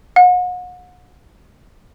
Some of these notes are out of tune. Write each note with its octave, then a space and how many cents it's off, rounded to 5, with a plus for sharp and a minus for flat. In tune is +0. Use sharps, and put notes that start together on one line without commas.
F#5 -40